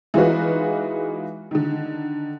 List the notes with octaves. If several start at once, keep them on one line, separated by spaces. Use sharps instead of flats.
E3 G#3 D#4 F4 F#4 B4
D3 D#3